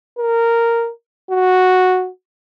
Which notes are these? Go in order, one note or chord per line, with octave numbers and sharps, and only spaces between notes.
A#4
F#4